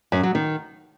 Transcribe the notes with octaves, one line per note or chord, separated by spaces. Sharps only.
F#2
F#3
D#3